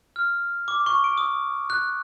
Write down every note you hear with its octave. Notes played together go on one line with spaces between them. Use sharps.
F6
D6
C#6
D7
D#6
F#6